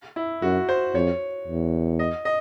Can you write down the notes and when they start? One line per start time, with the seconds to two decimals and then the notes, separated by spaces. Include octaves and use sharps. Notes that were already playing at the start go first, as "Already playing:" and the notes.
0.16 E4
0.42 F#2 F#4
0.69 C5
0.94 F2 C#5
1.47 E2
1.99 D#5
2.25 D#5